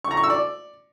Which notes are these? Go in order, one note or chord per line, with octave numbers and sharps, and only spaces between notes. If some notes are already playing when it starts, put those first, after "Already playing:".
C#6
A#5
C#6
E6
D5